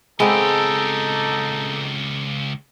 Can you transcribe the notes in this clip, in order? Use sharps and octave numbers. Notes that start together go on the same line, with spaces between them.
C#2 G#3 B3 C4 D#4 G4 A4